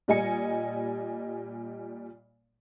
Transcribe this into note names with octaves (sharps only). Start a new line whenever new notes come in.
A#2 G3 D5 D#5 G#5 C#7